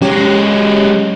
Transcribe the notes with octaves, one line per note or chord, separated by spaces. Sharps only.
F#3 G#3 C#4 G4 C#5